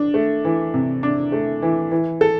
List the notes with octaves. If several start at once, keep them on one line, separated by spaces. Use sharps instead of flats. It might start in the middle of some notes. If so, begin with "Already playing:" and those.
Already playing: D4
A3
E3
C3
D4
A3
E3
E3
A4